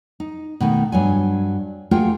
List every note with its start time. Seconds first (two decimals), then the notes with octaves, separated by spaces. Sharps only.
0.20 D#4
0.60 B2 D#3 A3
0.92 G2 F#3 G#5
1.91 A3 A#3 F4 F#4 G#4 G5